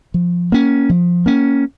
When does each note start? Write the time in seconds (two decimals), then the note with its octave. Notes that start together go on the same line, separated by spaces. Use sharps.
0.14 F3
0.52 A#3 C#4
0.89 F3
1.26 A#3 C#4